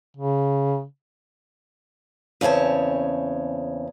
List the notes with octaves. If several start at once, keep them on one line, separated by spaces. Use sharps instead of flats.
C#3
E2 C#3 C4 C#5 A5